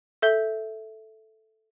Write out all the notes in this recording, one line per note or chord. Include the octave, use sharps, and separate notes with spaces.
A4 E5 G6 G7